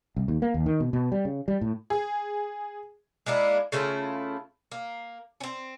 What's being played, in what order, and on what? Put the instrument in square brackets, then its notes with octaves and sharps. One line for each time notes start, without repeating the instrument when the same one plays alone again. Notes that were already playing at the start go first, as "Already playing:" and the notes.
[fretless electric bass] C2
D#2
A#3
D#2
D#3
B2
B2
G3
C#3
G3
A2
[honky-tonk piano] G#4
[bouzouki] G#3 A#3 D4 E4
C#3 A3 E4 F4
A#3
C4 C#4